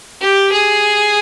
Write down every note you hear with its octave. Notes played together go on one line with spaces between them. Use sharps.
G4
G#4